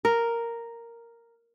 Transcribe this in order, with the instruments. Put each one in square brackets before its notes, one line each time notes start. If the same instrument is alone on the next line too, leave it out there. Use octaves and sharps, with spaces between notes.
[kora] A#4